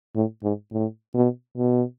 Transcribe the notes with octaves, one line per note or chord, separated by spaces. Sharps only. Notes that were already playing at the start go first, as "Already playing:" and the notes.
A2
G#2
A2
B2
B2